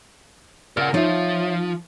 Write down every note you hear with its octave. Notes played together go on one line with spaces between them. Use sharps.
C#3 A#4 D5 F#5 F6
F3 D#4 F4 C#5 E5